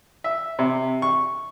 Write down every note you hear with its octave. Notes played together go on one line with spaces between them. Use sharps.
E5
C3
C#6